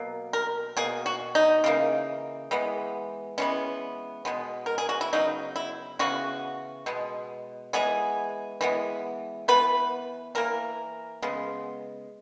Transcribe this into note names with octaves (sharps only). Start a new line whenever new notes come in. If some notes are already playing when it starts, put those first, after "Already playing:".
Already playing: B2 F#3 A#3
A#4
B2 A#3 G#4
F#4
D#4
C#3 E3 A#3
E3 G#3 B3
E3 G#3 B3 C#4
B2 G#3 B3
A#4
G#4
F#4
E4
C#3 F#3 B3 D#4
E4
C#3 E3 B3 F#4
B2 G#3 B3
E3 G#3 B3 G#4
E3 G#3 B3
E3 B3 B4
E3 A#3 A#4
C#3 G#3 B3